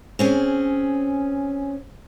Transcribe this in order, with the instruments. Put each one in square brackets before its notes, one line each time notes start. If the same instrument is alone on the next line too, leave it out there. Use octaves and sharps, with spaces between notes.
[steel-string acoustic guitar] C4 C#4 G#4